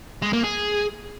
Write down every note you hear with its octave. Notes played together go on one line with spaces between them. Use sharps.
G#3
A#3
G#4